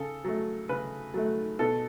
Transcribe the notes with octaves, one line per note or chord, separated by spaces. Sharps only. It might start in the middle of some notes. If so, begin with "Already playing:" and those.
Already playing: C#3 A4
F#3 A3
C#3 B4
F#3 A3
B2 A4